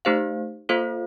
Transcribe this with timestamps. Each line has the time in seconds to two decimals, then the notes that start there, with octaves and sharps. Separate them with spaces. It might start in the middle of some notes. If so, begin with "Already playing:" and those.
0.05 A3 D#4 G4 C5 F5
0.69 A#3 F4 A4 C5 F5